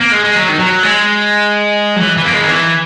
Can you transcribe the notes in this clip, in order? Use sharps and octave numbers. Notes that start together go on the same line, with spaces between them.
A#3
G#3
G#3
F#3
D#3
F#3
G#3
F#3
E3
E3
A#3
G#3
D#3
E3